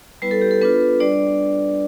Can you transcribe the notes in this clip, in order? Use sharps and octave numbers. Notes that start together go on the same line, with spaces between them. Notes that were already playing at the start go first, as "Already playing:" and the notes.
G3 B3 E4 B4
A4
G4
A4
B3 D4 F4 B4
G3 D4 D5